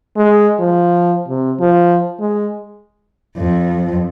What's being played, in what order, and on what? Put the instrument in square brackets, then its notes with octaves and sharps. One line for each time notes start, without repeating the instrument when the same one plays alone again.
[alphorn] G#3
F3
C3
F3
G#3
[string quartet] F2